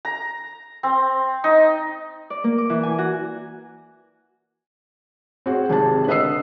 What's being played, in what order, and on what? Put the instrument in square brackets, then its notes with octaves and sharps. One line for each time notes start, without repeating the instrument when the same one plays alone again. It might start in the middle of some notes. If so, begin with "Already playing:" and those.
[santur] A#5
C4
D#4
[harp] D5
A#3
D6
E3
G#5
F#4
[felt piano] C4 F#4 G#4
G#1 C3 G#4 A5
D3 B4 D#5 D#6 E6 C7